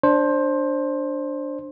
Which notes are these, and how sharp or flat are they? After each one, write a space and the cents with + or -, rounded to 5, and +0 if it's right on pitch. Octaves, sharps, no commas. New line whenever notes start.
D4 +0 C5 +15